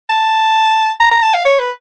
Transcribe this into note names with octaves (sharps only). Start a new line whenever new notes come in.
A5
A#5
A#5
A5
F5
C#5
B4